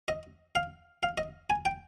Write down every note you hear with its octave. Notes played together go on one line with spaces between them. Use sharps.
D#5
F5
F5
D#5
G#5
G5